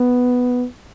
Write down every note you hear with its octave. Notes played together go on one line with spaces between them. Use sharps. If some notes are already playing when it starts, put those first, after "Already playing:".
Already playing: B3